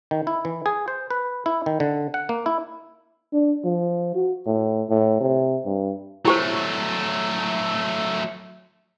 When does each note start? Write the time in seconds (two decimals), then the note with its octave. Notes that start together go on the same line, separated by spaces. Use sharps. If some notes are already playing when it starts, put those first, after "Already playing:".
0.11 D#3
0.27 E4
0.45 E3
0.66 G#4
0.88 C5
1.11 B4
1.46 E4
1.66 D#3
1.80 D3
2.14 F#5
2.29 A#3
2.46 E4
3.33 D4
3.65 F3
4.15 F#4
4.47 A2
4.90 A2
5.21 C3
5.65 G2
6.25 F#3 A3 E4 G4 C5